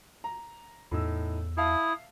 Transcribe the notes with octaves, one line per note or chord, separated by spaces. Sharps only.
A#5
E2 A2 D#4 E6
E4 E5 F5 A5 D#6